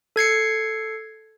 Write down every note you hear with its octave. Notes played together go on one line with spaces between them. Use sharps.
A4 G#6 C7 C#7